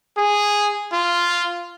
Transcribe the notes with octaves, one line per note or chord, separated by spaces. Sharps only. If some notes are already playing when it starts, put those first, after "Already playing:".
G#4
F4